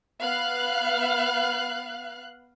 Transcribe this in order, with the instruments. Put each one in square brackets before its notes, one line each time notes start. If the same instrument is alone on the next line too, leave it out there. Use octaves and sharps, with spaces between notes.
[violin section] B3 F5 F#6